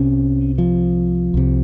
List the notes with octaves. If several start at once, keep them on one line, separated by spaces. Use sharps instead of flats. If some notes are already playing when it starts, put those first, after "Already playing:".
Already playing: C2 C3 C#4
F3
C2 C3